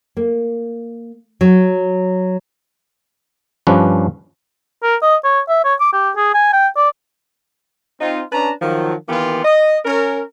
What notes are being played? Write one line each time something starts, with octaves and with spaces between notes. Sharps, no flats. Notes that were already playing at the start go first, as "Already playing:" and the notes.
A#3
F#3
G2 F3 C#4 D4 B4
A#4
D#5
C#5
E5
C#5
D6
G4
G#4
G#5
G5
D5
C4 D#4 F4
C#4 D4 B4 A5 A#5
D#3 F3 F#3
D#3 E3 A#3 B3 F4 G4
D#5
C#4 A#4